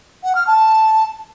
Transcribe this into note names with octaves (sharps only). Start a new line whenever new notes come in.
F#5
F6
A5